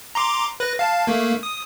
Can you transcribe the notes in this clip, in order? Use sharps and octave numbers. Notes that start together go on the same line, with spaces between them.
A#5 C6 D6
B4 F#6 A#6
F5 A5
A3 A#3
D#6